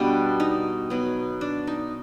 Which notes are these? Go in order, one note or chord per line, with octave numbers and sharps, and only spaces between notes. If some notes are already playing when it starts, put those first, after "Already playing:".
Already playing: B2 G3 B3 D4
D#4
B2 F#3 B3
D4
D#4